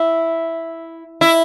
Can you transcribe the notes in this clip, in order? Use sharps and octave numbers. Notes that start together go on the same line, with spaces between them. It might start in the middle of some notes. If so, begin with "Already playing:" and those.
Already playing: E4
E4